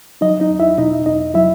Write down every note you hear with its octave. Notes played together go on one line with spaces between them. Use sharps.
F#3 D#4 D#5
D#4 D#5
E2
E4 E5
B2 D#4 D#5
E2 D#4 D#5
F#3 E4 E5